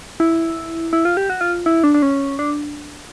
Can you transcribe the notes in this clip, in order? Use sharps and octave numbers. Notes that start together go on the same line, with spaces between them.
E4
E4
F4
G4
F#4
F4
E4
D4
D4
C#4
D4